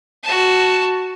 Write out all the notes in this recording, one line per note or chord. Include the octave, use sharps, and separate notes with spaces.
F#4 A5